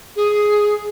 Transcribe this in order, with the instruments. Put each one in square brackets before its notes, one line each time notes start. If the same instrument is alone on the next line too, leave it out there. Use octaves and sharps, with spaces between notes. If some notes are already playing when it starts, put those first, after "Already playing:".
[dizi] G#4